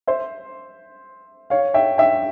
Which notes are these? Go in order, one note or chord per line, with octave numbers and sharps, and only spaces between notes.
C5 E5
C#5 F5
E5 G5
E5 G5